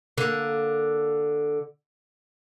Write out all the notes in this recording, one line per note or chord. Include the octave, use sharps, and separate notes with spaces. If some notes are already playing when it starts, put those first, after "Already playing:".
D3 A#3